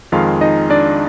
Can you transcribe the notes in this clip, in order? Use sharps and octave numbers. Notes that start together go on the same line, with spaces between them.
F2 D#3 G#3 F4 F5
D#4 D#5
D4 D5